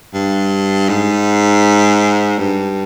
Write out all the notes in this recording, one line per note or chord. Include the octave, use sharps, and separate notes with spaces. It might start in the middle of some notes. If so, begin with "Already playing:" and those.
G2
G#2
G2